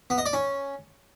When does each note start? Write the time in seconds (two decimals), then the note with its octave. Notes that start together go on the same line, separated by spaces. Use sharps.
0.10 B3
0.18 D#5
0.26 D5
0.33 C#4